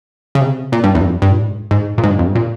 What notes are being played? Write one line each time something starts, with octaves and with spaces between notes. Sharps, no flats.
C#3
C3
A#2
G2
E2
G2
F2
G2
A#2
G#2
G#2
A#2
G#2
G2
F2
G2
A#2